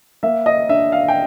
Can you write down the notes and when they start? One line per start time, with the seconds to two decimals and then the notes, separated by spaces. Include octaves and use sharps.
0.23 A#3 E5
0.46 D#5
0.69 D4 E5
0.92 F5
1.08 G5